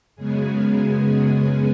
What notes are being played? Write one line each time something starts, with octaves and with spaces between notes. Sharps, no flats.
F#2 C#3 G#3 B3 G#4